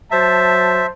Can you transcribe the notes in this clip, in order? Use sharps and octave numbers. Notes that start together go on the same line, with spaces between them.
F#3 C5 E5 A5